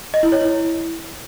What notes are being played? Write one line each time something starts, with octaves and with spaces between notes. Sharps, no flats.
D#5
E4
C#5
E4